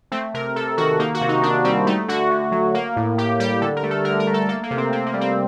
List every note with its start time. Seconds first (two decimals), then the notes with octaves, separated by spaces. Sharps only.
0.12 A3 C4
0.34 C3 A#4
0.56 C3 A4
0.78 D#3 F#4
0.99 A#3 D#4
1.14 F#4
1.21 C3
1.29 D#4
1.43 C3 D4
1.64 G3 C4
1.87 A3 D#4
2.08 D3 F#4
2.31 D3
2.52 F#3
2.74 A#3
2.96 A2
3.18 A2 G4
3.40 G3 G4
3.62 D3 A4
3.76 A#4
3.83 A3
3.91 A4
4.05 D3 A#4
4.20 A#4
4.27 A3
4.34 A4
4.49 A#3 A4
4.63 A#3
4.71 C3
4.78 C4
4.92 C3 C4
5.06 A#3
5.14 G3
5.21 C4